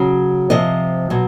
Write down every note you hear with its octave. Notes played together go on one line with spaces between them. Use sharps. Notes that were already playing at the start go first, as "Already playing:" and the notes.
Already playing: C#3 F#3
C3 F3 D#5
B2 F#3